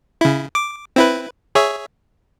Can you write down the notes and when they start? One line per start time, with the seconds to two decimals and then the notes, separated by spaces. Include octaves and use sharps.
0.21 C#3 E4
0.55 D6
0.96 C4 E4 B4
1.55 G#4 C#5 E5